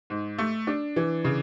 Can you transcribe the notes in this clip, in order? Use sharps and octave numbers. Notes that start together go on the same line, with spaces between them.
G#2
A3
D4
E3
C#3